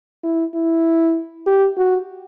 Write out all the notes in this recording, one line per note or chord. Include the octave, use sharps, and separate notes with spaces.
E4
E4
G4
F#4